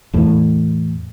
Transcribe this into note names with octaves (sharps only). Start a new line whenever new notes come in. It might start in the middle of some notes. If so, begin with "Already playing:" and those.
E2 A2